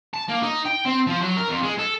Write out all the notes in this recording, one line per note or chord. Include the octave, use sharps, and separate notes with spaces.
A5
A#3
D#4
G5
C4
F3
F#3
A#4
F2
G#3
A4